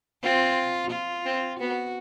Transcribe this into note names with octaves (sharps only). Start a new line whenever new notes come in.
C4 F4
F4
C4
B3 F#4